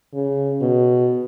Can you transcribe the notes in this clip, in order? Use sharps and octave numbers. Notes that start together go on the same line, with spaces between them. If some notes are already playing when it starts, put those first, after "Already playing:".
C#3
B2